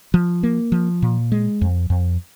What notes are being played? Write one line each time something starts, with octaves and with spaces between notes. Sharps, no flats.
F3
A#3
F3
A#2
G#3
F2
F2